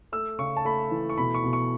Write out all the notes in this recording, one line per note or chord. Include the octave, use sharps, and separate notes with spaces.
A3 E6
C#3 C#6
A5
A3 B5
E3
C#6
B2 B5
C#6
B2
C#6